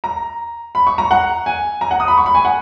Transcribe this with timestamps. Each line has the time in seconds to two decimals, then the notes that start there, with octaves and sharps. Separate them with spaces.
0.04 A#5
0.75 B5
0.87 C#6
0.98 A#5
1.11 F#5
1.46 G#5
1.81 A#5
1.91 F#5
2.00 D#6
2.08 B5
2.17 C#6
2.26 B5
2.35 G#5
2.45 F#5